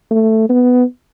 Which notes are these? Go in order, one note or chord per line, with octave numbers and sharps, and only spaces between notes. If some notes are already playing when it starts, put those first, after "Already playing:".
A3
B3